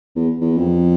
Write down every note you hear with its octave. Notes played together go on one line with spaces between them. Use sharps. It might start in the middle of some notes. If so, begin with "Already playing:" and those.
E2
E2
F2